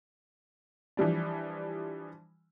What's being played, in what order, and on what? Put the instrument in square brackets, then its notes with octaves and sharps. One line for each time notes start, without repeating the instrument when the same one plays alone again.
[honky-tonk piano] E3 F3 G3 D4